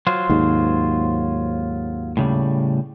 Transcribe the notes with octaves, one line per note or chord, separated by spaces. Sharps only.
F#3 F4 C5
D#2 G#2
A2 C#3 G3